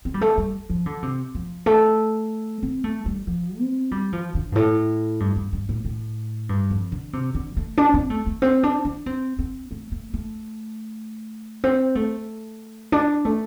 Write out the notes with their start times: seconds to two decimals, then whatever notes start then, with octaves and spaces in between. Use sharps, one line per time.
0.05 C4
0.14 G3
0.21 A3
0.38 G3
0.70 F3
0.86 D3
1.03 C3
1.35 F3
1.66 A3
2.63 C4
2.84 A3
3.06 G3
3.27 F3
3.59 C4
3.91 G3
4.13 F3
4.35 D3
4.52 G2
4.56 A2
5.20 G2
5.36 G2
5.53 G2
5.69 A2
5.85 A2
6.49 G2
6.70 F2
6.92 D3
7.13 C3
7.34 D3
7.57 A3
7.78 D4
7.94 C4
8.10 A3
8.26 A3
8.42 C4
8.63 D4
8.85 D4
9.06 C4
9.39 C4
9.71 A3
9.92 A3
10.14 A3
11.64 C4
11.95 A3
12.92 D4
13.25 A3